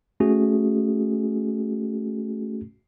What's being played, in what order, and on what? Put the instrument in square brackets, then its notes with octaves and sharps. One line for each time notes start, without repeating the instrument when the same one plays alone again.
[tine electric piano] A3 C#4 F#4 G#4